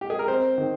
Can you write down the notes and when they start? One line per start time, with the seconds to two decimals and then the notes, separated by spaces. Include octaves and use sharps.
0.01 G4
0.10 G#4
0.19 A#4
0.28 C4 C5
0.58 D#3